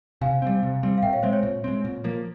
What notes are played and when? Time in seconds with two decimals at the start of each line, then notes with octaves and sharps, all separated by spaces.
0.21 C3 F5 G#5
0.42 G3 C4
0.63 C3
0.83 G3 C4
0.98 F5
1.03 A#2 E5 G5
1.13 C#5 F5
1.23 G#3 C4 C5 E5
1.33 C#5
1.43 A#2
1.64 G#3 C4
1.84 A#2
2.04 F3 A#3